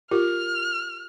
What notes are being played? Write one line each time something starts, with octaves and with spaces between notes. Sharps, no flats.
F4 G4 A#4 F6